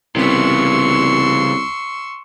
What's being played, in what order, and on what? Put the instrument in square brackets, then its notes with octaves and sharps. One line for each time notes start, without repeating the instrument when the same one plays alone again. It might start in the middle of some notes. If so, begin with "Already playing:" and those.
[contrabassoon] C2 [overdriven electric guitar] C#3 B3 [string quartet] C6 C#6 E6